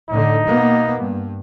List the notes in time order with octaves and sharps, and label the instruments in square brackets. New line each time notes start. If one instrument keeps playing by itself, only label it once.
[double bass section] A2 D3 [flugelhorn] D#4
[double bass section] B2 A#3 B3
G2